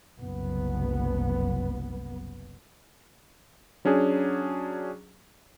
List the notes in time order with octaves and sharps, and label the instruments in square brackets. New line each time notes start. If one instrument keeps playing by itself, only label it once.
[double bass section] F#1 C2 B3
[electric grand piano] F#3 C#4 D4 G#4